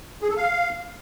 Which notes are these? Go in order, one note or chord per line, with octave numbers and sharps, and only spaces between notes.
G#4
A4
F5